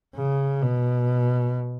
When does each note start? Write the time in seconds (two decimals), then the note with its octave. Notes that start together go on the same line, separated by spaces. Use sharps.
0.15 C#3
0.62 B2